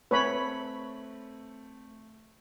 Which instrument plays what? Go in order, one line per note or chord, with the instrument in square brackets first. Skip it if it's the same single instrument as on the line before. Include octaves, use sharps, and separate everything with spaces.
[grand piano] A3 C4 A4 [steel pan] B4 C#5 B5